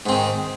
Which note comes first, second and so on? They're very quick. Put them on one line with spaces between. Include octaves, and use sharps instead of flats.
G#2 C4 D#3